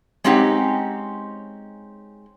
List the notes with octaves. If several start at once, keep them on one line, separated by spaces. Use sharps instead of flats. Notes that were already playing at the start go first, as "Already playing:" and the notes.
G#3 C4 C#4 D#4 G4 F#5